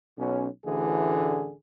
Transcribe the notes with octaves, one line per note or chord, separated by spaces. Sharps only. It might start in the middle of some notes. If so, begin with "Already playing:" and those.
B1 B2 C#4
A1 D2 D3 E3 G#4